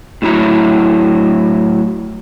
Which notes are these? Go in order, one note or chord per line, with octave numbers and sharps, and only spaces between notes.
A2 F#3 E4 A#5